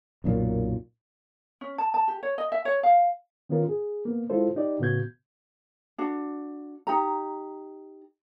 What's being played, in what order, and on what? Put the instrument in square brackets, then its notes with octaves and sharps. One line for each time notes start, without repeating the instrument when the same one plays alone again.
[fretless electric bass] B1 F#2 A#2
[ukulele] C#4
A5
A5
G4
C#5
D#5
E5
C#5
F5
[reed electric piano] D#3 B3 C#4 F4 A#4
G#4
A#3 B3
G#3 E4 F4 A4 C5
D#4 G4 D5
A2 C#3 B3 F#4 G6 G#6
[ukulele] D4 F#4
D#4 G4 A#5